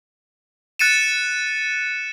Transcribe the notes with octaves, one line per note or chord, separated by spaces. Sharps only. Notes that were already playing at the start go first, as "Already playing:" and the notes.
F#6 A6 C#7 D#7 E7